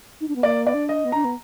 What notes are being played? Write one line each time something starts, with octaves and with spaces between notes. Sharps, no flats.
D#4
D4
B3
A#3 D5
B3 D5
D4
D#5
B3
D4 A#5
B3